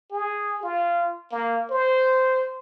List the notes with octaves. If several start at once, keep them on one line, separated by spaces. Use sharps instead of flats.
G#4
F4
A#3
C5